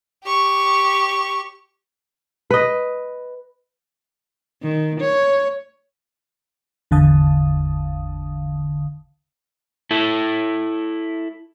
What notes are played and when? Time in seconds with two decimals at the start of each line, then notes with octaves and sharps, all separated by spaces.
0.24 G4 C#6
2.51 B4 D#5
4.62 D#3
5.00 C#5
6.91 G#1 E2 D3 F5 A5 D#6
9.91 E4 A4